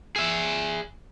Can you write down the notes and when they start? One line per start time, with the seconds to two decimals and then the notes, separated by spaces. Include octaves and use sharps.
0.16 G#4 E5